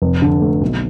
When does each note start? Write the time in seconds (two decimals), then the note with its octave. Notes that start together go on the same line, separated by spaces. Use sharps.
0.02 F1
0.22 D3
0.41 A3
0.61 B1